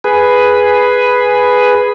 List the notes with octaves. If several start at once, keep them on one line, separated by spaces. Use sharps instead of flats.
G#4 B4